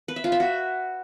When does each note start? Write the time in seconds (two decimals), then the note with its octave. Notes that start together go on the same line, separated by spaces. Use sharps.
0.08 B4
0.16 E5
0.24 F4
0.32 E5
0.40 F#4